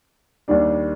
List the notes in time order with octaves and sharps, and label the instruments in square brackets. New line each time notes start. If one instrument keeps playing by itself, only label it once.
[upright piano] D#2 D#3 G3 D4